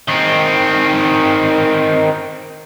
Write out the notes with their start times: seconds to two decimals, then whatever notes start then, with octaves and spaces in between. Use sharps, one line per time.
0.08 D#3 C4